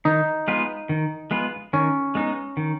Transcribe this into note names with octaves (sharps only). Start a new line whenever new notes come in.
D#3 D#4
G#3 B3 F4 B4
D#3
G#3 B3 F4 B4
D#3 C#4
G#3 B3 D#4
D#3